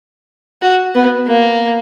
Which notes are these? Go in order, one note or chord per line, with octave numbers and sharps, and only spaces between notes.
F#4
B3
A#3